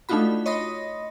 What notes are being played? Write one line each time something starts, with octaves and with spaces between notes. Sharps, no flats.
A3 D4 D#4 F4 F#4 B5
C#5 D#5 B5 C6 D#6 A#6